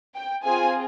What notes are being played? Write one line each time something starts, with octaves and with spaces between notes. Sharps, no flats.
G5
C4 F4 G#4 G#5